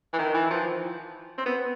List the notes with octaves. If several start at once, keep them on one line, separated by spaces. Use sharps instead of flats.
E3
D#3
E3
F3
C4
B3